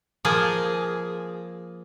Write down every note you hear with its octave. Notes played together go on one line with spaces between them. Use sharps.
F3 A#3 G#4